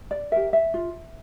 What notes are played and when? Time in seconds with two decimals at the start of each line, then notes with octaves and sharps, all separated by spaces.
0.11 D5
0.32 G4 A#4 E5
0.53 E5
0.74 F4